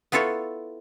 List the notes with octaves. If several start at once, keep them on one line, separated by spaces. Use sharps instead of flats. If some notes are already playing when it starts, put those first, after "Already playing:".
B3 E4 F4 A4 C#5